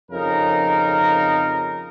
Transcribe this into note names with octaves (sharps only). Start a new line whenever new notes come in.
F2 C#3 D#4 A#4